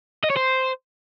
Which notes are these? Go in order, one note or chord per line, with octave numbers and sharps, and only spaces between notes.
D#5
C#5
C5